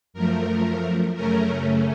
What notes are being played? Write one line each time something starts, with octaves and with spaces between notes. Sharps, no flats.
F#2 F3 A3 A#4
F#2 C#3 A3 C#4 A#4